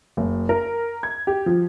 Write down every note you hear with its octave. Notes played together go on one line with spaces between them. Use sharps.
F#1
A#4
G#6
G4
F3